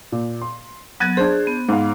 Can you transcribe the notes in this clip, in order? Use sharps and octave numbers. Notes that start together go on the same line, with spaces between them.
A#2
C6
F#3 B3 F#6 G#6 A6
D4 G#4 C5
B3
G#2 F5